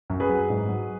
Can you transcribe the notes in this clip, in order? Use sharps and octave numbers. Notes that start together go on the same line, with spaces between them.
F#2
G#4 B4
F#3
G#2
F#3